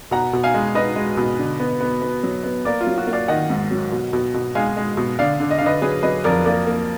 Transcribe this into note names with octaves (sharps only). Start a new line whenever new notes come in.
B2 F#5 A#5
B2
F5 G#5
G#3
D#4 B4 D#5
G#3
B2
D3
B3
B3
B3
F#3
B3
A#3 A#4 D5
F4
F#3
F#4
A#3
D5 F5
D#3 D#5 F#5
G#2
F#3
B2
B2
B2
G#3 F5 G#5
G#3
B2
D3 D5 F5
D3
D#5
D3 F5
B4 D#5
F#3 G#4 B4
F#3 B4 D#5
F2 A#4 D5
A#3 A#4 D5
A#3